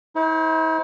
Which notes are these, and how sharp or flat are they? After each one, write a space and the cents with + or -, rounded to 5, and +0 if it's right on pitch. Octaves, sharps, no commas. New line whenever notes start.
E4 -45 C5 +0